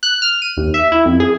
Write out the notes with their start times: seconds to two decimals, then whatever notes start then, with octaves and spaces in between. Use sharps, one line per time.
0.03 F#6
0.22 F6
0.42 D#7
0.57 D#2
0.74 E5
0.92 E4
1.05 F2
1.20 G#4